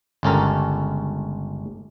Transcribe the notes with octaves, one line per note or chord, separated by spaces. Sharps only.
G1 C#2 C#4 G4 A4 A#4